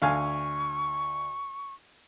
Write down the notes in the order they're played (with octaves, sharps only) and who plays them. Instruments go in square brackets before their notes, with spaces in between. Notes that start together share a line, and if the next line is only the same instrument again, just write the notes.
[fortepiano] D2 F5 G#5 [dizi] C#6